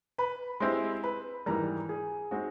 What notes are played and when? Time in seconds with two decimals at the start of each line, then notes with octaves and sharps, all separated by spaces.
0.18 B4 B5
0.60 G#3 C4 E4 G4 C5 C6
1.03 B4 B5
1.46 G#2 E3 G3 A#4 A#5
1.89 G#4 G#5
2.31 G#3 C4 D#4 F#4